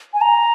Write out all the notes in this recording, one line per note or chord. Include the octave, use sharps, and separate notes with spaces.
G#5
A#5